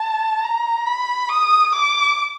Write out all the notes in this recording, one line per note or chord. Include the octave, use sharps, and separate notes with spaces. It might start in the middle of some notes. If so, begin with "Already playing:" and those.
Already playing: A5
A#5
B5
D#6
D6